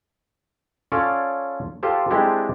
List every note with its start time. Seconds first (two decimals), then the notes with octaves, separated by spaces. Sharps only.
0.92 C#4 F4 A4 C#5 D5
1.83 F4 G4 A4 C5
2.10 G#3 C4 D4 E4 G4 A4